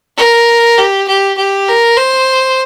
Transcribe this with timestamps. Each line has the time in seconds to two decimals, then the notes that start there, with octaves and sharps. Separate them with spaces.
0.17 A#4
0.78 G4
1.08 G4
1.38 G4
1.68 A#4
1.97 C5